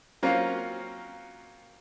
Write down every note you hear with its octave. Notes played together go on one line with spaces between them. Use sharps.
F#3 A#3 C4 C#4 F4